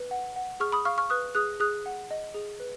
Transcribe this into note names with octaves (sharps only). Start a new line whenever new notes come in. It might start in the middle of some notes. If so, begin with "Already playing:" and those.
Already playing: B4
F#5
F#5
G#4 C#6 F6
B5 D#6
F5 C#6 F6
C#6 F6
B4 D#6 F#6
G#4 D#6 F#6
G#4 D#6 F#6
F#5
D#5
G#4
B4